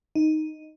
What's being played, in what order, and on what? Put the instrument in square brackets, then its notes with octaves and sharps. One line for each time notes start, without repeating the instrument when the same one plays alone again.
[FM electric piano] D#4